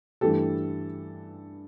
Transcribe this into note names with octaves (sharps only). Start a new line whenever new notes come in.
G2 E3 A3 G4 A4